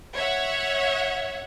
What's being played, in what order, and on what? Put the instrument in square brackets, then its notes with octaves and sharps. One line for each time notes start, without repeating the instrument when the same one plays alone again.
[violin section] C#5 E5 F#5